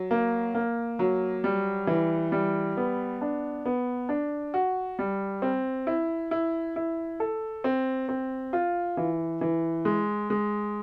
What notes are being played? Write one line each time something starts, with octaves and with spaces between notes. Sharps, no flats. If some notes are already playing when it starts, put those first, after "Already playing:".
Already playing: F#3
A#3
A#3
F#3
G3
E3
G3
B3
D4
B3
D4
F#4
G3
C4
E4
E4
E4
A4
C4
C4
F4
E3
E3
G#3
G#3